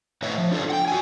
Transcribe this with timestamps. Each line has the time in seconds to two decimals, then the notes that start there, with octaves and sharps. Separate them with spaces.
0.22 A2 B4 C#5 D#5 E5
0.38 F3
0.51 D4 F4 A4 D5
0.70 F#5 G5
0.88 F#4 G#5